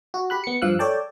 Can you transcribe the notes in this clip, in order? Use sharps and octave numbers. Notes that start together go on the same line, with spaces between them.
F#4
G4 B5 F#6
B3 C#7
G2 F3 F5 E6 F#6
A4 C#5 D5 G5 A5